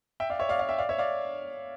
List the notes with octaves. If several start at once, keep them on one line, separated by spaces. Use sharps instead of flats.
E5 G5
D5 F5
C#5 E5
D5 F5
D5 F5
E5 G5
D5 F5
C#5 E5
D5 F5